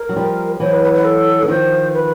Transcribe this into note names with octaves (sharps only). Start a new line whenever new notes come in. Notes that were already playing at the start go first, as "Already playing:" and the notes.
Already playing: A#4
F#3
F3 G3
E3 F#3 C5
B4
B4
B4
A4
E3
D#3 F3 C5
B4